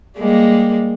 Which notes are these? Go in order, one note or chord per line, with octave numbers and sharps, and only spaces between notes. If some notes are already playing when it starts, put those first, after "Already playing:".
G3 G#3 A#3